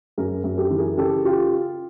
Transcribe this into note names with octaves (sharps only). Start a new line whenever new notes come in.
F#2 G#4 A#4
F#2
G4 A4
E3
G#4 A#4
C#3 G4 A4
F4 G4